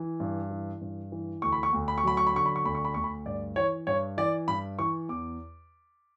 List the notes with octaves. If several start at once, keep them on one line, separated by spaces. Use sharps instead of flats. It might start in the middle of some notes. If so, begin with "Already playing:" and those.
Already playing: E3
G2
E3
G2
E3
D2 C#6
B5
C#6
D2
B5
C#6
F#3 B5
C#6
B5
D3 C#6
B5
C#6
D2 B5
C#6
B5
D2 C#6
B5
G2 D5
E3 C#5
G2 C#5
E3 D5
G2 B5
E3 C#6
E2 D6